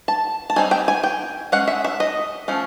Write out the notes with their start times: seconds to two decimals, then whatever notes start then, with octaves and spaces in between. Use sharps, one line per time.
0.08 A5
0.50 A5
0.56 G3 C4 D#4 G#5
0.71 G5
0.88 G#5
1.03 G5
1.52 G#3 C#4 F#5
1.68 E5
1.84 E5
2.00 D#5
2.48 F3 A3 C#4